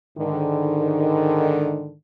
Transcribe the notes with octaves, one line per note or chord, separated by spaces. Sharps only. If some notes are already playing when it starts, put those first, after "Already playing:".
G#2 D3 D#3